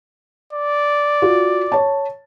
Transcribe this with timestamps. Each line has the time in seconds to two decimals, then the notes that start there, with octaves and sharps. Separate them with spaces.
0.53 D5
1.22 F4 F#4
1.72 C#5 A5